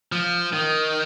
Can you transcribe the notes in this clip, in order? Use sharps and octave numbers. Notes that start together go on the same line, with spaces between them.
F3
D#3